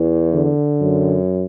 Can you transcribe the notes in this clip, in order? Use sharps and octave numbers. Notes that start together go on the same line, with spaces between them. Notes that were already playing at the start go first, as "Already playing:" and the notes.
Already playing: E2 E3
D3
F#2